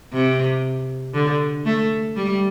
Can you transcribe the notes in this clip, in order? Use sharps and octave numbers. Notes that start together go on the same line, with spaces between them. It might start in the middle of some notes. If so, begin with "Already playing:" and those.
C3
D3
A3
G3